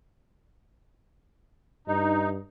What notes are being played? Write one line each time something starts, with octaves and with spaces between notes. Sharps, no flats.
G2 D#4